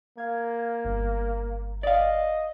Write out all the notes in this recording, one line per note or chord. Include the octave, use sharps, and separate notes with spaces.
A#3 F5 G#6
G1
D5 D#5 F5